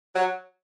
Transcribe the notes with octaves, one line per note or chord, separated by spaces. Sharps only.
F#3